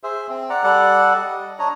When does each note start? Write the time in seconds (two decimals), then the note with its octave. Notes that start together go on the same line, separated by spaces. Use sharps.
0.03 G#4 C5 E5
0.30 C4
0.50 D5 F#5 A#5
0.64 G3 A4 D5 F#5
1.16 D#5
1.59 D4 C#5 D#5 A#5